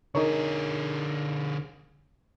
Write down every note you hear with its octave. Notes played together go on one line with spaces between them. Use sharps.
D3 D#4 G#4 A#4 C#5